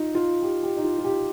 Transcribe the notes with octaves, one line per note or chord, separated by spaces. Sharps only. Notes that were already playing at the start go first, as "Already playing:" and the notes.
Already playing: D#4 F4
F4
G4
G4
D#4
F4
F4
G4